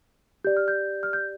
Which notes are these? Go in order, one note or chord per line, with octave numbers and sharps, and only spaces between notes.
G4 D5 G6
F6
G6
F6
G6